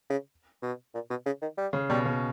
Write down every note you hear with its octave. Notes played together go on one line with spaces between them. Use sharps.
C#3
B2
A#2
B2
C#3
D#3
G3
C#3
B2 G3
C#3